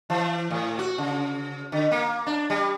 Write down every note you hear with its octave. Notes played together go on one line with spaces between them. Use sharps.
E3
A2
F#4
C#3
D3
A#3
D4
G3